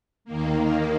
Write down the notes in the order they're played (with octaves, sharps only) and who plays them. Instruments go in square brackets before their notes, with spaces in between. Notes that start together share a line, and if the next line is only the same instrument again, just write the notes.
[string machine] D#2 D#3 A#3